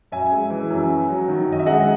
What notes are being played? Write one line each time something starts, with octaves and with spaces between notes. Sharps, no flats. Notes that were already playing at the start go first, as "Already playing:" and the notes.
F#2 E5 G#5
G#3
E3
F#2
F#2
F#3
D#3
F#2 D#5
E5
G#3 D#5 F#5